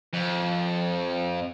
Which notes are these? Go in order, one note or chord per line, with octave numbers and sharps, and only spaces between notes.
F2